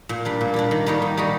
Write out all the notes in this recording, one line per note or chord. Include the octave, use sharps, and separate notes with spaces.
A#2
G3 A#3 D4
A#2
G3 A#3 D4
D#3
G3 A#3 D#4 F#4
D#3
G3 A#3 D#4 F#4